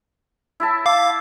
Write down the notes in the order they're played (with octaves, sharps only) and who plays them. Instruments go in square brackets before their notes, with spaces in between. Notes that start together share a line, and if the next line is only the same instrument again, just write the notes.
[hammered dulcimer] E4 E5 A5
[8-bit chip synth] F5 D6